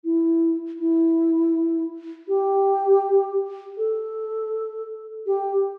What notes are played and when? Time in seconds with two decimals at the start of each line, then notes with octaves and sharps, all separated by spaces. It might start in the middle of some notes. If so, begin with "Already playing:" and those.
0.05 E4
0.79 E4
2.28 G4
3.78 A4
5.27 G4